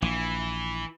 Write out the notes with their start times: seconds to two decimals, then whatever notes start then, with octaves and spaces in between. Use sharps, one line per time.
0.02 A#1 E3